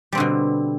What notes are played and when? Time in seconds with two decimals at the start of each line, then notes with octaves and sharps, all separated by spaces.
0.12 G3
0.15 C4
0.17 D3
0.20 B2